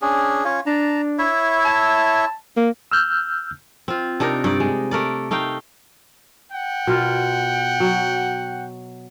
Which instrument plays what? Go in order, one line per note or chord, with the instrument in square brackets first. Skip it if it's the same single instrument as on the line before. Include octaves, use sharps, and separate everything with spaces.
[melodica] C#4 D4 G#4
C#4 F4 C#5
[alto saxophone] D4 [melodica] A5 A#5
[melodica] E4 C#5 E5
[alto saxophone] A5
A#3
[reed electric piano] E6 F6 G6
[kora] C4 F4
C3 D4 D#4 A#4
G2 D#4 D5
G#3
A3 A#4 D5
A3 D#4 F5 G5
[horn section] F#5 G5
[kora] B2 F4 A#4
F#3